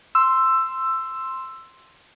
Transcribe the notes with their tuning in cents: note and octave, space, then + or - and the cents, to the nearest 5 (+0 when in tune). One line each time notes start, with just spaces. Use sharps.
C6 +0 E6 +10